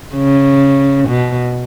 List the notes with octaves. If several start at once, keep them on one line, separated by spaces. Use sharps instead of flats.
C#3
B2